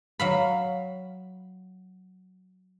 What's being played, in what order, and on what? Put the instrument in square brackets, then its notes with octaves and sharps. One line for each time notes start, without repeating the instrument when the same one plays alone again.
[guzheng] F#3 F5 B5